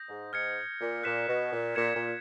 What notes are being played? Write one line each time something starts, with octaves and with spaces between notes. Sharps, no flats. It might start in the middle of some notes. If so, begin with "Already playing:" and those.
Already playing: D#6 G6 A#6
G#2
G#2 F6 G#6 C#7
A#2
A#2 F#6 B6 E7
B2
A#2
A#2 G#6 C#7 E7
A#2